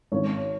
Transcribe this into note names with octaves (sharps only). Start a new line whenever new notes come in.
G#1 C#5